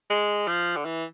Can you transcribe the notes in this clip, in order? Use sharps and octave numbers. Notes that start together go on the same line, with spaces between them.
G#3
F3
D3
E3